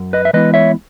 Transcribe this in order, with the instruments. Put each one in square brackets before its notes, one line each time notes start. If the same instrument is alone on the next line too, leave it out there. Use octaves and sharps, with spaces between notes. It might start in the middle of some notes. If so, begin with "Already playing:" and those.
Already playing: [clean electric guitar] F#2
B4 D#5
E5
E3 G#3 B3 E4 B4 D#5
C#5 E5